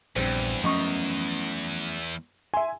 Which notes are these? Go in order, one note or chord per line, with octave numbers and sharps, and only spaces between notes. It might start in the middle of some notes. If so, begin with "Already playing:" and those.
A#1 E2 G2 C4
F#2 F3 A3 C#4 D#5 C#6
E5 G#5 C6